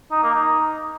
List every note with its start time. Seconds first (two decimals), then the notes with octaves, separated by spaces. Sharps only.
0.11 D#4
0.23 A#3
0.34 D#4